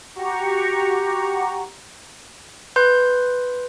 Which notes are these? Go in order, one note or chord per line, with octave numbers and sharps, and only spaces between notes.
F#4 G4 A#5 C#6
B4 C6 G6